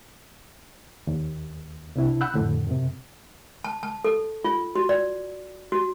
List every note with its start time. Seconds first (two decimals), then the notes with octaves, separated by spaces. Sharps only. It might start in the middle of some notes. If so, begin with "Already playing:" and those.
1.07 D#2
1.95 C2 C3 D4 E4
2.21 F#5 B5 E6 F#6 G6
2.34 F2 A2 D3
2.67 F#2 C3
3.64 A5
3.83 A5
4.04 A4
4.44 F4
4.75 F#4
4.89 D5
5.72 F#4